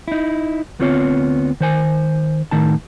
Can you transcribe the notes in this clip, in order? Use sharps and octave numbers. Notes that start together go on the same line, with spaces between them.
D#4 E4
D2 B3 C4 F4 C#5
D#3 C5 G#5
A2 D#3 D#4 A5